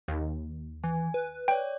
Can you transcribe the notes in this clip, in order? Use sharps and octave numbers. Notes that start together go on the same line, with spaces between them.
D#2
E3 G#5
B4
C#5 D5 G5